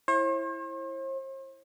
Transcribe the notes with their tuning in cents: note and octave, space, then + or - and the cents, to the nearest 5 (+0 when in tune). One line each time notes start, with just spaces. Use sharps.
E4 +5 C5 +45